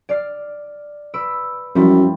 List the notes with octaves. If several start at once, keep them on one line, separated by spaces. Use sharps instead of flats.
D5 F6 C7
B4 E6 D7
F#2 F3 G3 E4